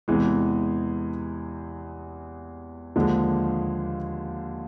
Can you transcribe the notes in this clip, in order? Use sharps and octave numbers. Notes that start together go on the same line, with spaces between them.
E2 C3 E3 G#3
D#2 D3 F3 G#3